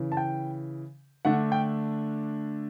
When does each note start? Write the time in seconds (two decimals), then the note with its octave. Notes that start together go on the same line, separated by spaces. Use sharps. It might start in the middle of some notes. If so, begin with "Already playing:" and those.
Already playing: C#3 E3
0.12 A5
0.17 G5
1.25 D3 A3 D4 F#5
1.52 G5